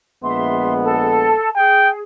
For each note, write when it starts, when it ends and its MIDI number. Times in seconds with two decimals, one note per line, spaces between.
0.23 1.35 34
0.23 1.35 56
0.23 1.35 59
0.23 0.73 76
0.23 0.73 84
0.83 1.49 69
0.83 1.49 81
1.56 2.00 68
1.56 1.90 79